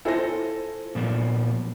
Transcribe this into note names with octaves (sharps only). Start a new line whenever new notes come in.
E4 F4 A4 C5 G#5 A#6
A#2 F3 B3